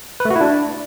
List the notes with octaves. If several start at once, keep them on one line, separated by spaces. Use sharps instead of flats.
B4
A3
F#4
E4
D4